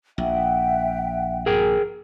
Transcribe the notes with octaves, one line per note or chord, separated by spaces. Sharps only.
A#1 E5 F#5 G5
G#4 A#4 G5